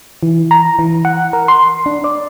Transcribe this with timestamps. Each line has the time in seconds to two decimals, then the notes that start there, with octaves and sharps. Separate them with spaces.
0.23 E3
0.51 A#5
0.79 E3
1.05 F#5
1.33 A#4
1.48 C6
1.86 D4
2.04 D5